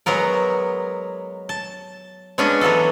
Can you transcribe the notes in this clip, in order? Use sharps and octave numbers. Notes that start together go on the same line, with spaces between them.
F#3 G#3 B3 A#4
A5
G#3 B3 C#4 D4 F#4
E3 F#3 B3 F#4 A4